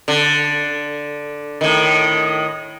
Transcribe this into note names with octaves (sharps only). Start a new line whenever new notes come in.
D3
A2 D#3